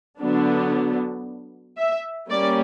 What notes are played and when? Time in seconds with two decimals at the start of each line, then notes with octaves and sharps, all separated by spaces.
0.20 D3 F#3 B3 D4
1.78 E5
2.30 G3 A#3 C#4 D5